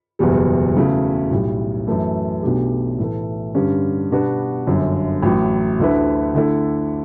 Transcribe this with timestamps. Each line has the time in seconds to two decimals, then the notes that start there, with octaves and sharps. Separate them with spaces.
0.19 F#1 E2 B2 G3
0.75 E2 C#3 F#3 A3 E4
1.31 B1 A2 G3
1.87 F#2 E3 A3
2.43 B1 B2 A3 D4 G4
2.99 A2 E3 A3
3.55 G2 D3 G3 C#4
4.11 B2 G3 B3 D4 F#4
4.67 G1 F#2 D3
5.23 A1 A2 F#3
5.79 D2 D3 A3 E4 B4
6.35 D3 A3 E4 A4